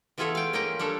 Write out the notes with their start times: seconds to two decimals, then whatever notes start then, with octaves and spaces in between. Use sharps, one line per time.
0.18 E3 B3 F4 G#4 A4 C#5
0.35 F5 G5
0.53 A#3 C#4 F4 D#5 G5
0.79 G3 D4 A4 C#5